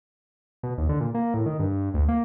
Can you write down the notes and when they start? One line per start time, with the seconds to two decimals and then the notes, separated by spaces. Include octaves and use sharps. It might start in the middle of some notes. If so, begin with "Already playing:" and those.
0.63 B2
0.78 D#2
0.89 D3
1.01 A#2
1.15 A#3
1.34 A2
1.46 D#3
1.59 G2
1.94 D2
2.09 A#3